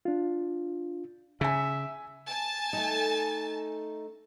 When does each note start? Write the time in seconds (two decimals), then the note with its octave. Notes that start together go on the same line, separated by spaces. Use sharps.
0.05 D4 F4
1.41 C#3 E5 G#5 B6
2.28 G#5 A5
2.73 A3 D#4